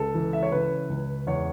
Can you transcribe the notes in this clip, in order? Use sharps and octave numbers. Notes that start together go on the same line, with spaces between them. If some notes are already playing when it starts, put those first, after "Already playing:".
Already playing: C#2 A4
E3
E5
C#5
C#3 B4
C#2
E2 C#5